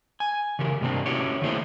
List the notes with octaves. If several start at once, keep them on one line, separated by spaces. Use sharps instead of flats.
G#5
C#3 E3 G4 A#4
G2 C3 A#3 C4 D4
C#4 E4 F#4 G4 C#5
D#3 A3 A#3 E4 G#4 C5